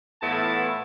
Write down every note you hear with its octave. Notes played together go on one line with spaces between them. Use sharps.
A2 E3 B3 E4 F4 A5